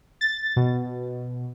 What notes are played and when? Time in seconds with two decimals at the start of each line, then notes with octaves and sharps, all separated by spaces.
0.21 A6
0.56 B2